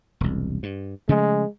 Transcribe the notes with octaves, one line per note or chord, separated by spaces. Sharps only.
E1 C2
G2
C#3 F3 G#3 A3